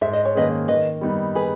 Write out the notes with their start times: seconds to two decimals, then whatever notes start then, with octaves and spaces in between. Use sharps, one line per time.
0.01 G#2 E5
0.13 D#5
0.25 C#5
0.35 D#3 A#3 C#4 G#4 B4 D#5
0.68 D#3 B4 D#5
1.01 G3 B3 D#4
1.35 G#4 B4